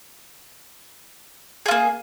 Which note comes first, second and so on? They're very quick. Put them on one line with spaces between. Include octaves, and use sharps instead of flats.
G#4 F4 A#3